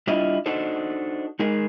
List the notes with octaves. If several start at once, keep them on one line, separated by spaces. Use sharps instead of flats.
G3 D4 E4 F4 D#5
D4 D#4 F#4 A4 C5
G#3 D#4 G#4 A#4